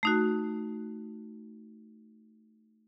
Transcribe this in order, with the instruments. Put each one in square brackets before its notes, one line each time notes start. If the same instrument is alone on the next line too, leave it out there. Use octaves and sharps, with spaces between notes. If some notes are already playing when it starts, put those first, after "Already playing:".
[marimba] A3 D#4 F#4